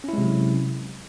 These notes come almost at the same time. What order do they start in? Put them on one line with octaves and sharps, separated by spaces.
C#4 E4 G#3 C3 F#3